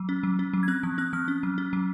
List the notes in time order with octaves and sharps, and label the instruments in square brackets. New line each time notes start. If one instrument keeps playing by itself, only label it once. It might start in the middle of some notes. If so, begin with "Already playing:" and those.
Already playing: [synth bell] F#3
C#4
F#3
C#4
F#3
G#6
C4 F#6
F3
C4 F#6
F3 F6
C#4
F#3
C#4
F#3